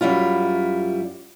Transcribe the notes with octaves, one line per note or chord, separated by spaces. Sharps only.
F#2 G3 E4 F4